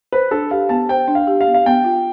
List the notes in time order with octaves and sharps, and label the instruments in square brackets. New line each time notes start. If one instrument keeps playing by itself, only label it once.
[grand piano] B4 [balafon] C5
[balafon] D4 [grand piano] A4
[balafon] G4 [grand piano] F5
[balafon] B3 [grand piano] A5
[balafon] C5 [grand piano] G5
[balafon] D4
[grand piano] F5
[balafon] G4
[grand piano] F5
[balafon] B3
[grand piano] F5
[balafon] B3 [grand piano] G5
[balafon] F4